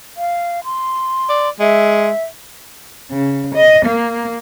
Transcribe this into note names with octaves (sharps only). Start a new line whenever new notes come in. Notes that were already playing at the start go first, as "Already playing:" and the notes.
F5
C6
D5
G#3 E5
C#3
D#5
A#3